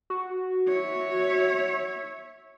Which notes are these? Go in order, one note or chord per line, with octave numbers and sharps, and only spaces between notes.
F#4
C#5 E5